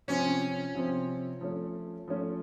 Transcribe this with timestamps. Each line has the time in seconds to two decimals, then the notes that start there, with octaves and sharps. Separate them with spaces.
0.08 C3 F3 C4 C#4
0.75 C3 F3 C4
1.41 F3 A3 C#4
2.08 F3 A3 C#4